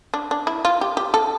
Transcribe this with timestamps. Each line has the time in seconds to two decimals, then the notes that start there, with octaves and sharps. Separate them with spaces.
0.14 D4
0.31 D4
0.47 E4
0.65 F4
0.81 G4
0.97 G4
1.14 A4